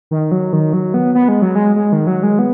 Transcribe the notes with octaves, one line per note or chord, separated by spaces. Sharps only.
D#3
F#3
D#3
F#3
B3
B3
G#3
F#3
G#3
G#3
D#3
F#3
G#3
B3